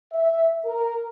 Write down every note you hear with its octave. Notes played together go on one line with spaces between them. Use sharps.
E5
A#4